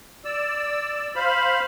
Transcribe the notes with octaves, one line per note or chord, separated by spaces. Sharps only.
D5 E6
C5 F5 B5